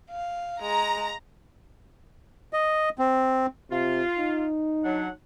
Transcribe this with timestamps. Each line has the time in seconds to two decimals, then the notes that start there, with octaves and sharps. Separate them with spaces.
0.10 F5
0.62 G#3 A#5
2.53 D#5
2.99 C4
3.71 C3 F4
4.19 D#4
4.84 F#3 D4 F#5